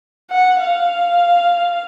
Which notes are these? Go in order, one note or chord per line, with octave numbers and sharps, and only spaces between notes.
F#5
F5